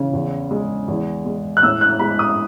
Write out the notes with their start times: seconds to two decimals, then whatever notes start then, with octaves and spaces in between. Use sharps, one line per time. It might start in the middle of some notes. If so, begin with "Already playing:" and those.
Already playing: C#3 E3
0.13 E2
0.51 G#3
0.88 E2
1.26 G#3
1.57 F#6
1.63 A2 E6
1.81 F#6
1.99 G#3 B5
2.19 D#6